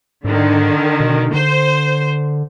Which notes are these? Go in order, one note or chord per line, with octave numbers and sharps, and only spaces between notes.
G#2 D3 D#3
B2
D3 C5